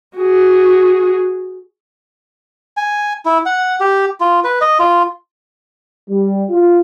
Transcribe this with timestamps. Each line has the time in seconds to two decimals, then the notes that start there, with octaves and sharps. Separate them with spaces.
0.18 F#4 G#4
2.77 G#5
3.25 E4
3.46 F#5
3.80 G4
4.20 F4
4.44 B4
4.61 D#5
4.80 F4
6.10 G3
6.51 F4